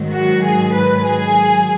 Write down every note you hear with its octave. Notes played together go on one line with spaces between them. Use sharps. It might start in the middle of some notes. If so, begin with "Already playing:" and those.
Already playing: G#2 D#3 F#3
F#4
G#4
B4
G#4